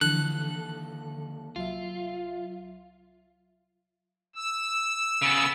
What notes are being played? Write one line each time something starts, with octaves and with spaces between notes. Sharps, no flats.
D#2 D3 E3 F3 A4 F#6
C2 F#3 F4 E5
E6
C#3 B3